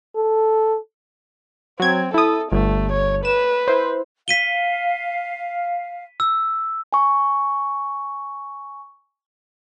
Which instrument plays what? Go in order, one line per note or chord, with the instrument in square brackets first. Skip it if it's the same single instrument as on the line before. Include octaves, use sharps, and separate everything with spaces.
[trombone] A4
[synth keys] F#3 G#6 [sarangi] C4
[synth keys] E4 D#6 [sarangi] A4
[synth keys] G1 [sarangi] A3
[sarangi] C#5
[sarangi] B4 [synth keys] E7
[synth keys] E4 C5
[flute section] F5 [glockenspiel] B6 D#7 G7
[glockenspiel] E6
[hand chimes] G#5 C#6